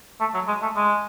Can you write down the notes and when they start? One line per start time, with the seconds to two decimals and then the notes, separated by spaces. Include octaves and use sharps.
0.20 A3
0.34 F#3
0.48 G#3
0.62 A3
0.76 G#3